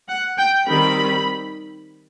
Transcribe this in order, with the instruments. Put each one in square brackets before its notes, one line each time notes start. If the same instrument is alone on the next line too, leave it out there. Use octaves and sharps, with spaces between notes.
[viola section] F#5
G5
D#3 G3 C4 B5